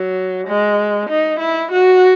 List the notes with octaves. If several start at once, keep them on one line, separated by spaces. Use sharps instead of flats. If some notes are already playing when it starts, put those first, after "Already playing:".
Already playing: F#3
G#3
D#4
E4
F#4